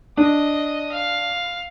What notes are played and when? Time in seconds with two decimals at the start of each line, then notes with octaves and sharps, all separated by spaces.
0.17 D4 D#5 D#6
0.91 F5